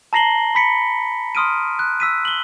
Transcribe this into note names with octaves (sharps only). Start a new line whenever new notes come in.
A5 A#5 A#6 C7 F#7 G7
B5 B6 C#7
C6 D#6 F6 D7 D#7
F#6
E6 B6 D#7
F#7 G7